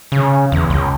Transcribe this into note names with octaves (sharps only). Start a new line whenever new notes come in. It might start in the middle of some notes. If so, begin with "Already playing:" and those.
C#3
E2
C#2